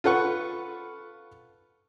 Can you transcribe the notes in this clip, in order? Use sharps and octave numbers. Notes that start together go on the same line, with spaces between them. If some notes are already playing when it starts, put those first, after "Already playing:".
F4 A4 B4 F#5 C#6